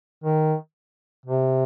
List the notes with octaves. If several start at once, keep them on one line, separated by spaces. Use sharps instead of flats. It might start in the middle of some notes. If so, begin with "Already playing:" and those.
D#3
C3